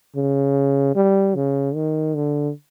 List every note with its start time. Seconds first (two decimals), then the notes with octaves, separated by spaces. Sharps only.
0.16 C#3
0.96 G3
1.35 C#3
1.75 D#3
2.15 D3